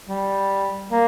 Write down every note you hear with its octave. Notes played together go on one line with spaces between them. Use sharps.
G3
A#3